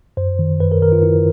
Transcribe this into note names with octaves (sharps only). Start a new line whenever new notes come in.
F#2 C5
D#3
F#2 B4
A#4
D#3 A#4
F4
F#2 E4